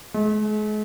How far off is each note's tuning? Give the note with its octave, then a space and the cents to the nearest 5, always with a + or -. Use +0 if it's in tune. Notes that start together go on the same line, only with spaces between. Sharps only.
G#3 +40